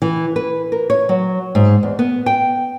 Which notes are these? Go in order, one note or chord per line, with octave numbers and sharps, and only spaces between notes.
E3
B4
A#4
C#5
F#3
G#2
E2
B3
G5